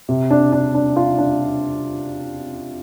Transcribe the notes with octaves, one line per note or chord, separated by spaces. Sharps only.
C3
D4
D4
D4
F4
D4